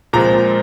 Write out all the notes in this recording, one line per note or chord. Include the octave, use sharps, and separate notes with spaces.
A#2 F3 G#3 C4 A#5